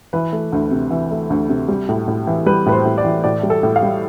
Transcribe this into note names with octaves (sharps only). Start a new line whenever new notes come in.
E3 B4
A3
D2
C3
E3
A3
D2
C3
G3
A2
A2
E3
G3 B4
A2 B4
C5
A2
D5
E3
A2 D5
G3
A4
A2
F5
G3